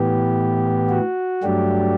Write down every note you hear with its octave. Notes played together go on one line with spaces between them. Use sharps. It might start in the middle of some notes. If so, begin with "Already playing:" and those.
Already playing: A2 E3 B3 G4
F#4
G2 F#3 A3 D4 G4